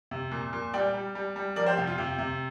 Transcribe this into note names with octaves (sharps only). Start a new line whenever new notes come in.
C3
A#2
A#2
G3 D5 G5
G3
G3
G3
F3 A#4 D5
G4 C5
C3 G4
F4
C3 G4
C3